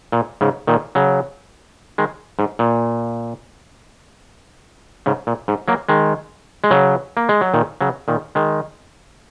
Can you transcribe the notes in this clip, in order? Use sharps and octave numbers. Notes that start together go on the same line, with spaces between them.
A#2
G#2 C#3
A#2 D#3
C#3 F#3
D#3 G#3
G#2
A#2
G#2 C#3
A#2
G#2
F#3 A#3
D#3 G#3
G#3
C#3 F#3
A#3
G#3
F#3
A#2 D#3
C#3 F#3
A#2 D#3
D#3 G#3